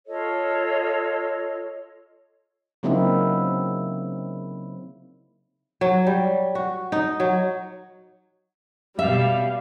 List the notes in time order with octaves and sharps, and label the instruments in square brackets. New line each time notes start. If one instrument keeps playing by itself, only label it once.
[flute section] F4 A4 C#5 D#5
[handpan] C#3 F#3 A#3 C4 D#4 E4
[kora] F#3
G3
F#4
D#4
F#3
[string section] B2 G3 [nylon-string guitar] E5 [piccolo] F5